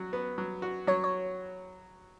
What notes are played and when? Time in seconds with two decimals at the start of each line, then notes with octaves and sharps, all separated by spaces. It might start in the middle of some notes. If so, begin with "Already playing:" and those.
Already playing: F#3 F#4
0.13 B3
0.38 F#3
0.62 F#4
0.87 F#3 C#5
1.04 C#5